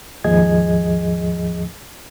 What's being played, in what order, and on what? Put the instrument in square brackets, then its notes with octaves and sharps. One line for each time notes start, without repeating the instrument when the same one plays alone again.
[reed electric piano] D#2 G#2 F3 G#4 D#5 G#6